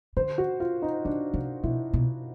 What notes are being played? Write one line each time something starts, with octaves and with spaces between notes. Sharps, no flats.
D3 C5
F#4
F4
D#4
C#3 D4
C3
B2 E4
B2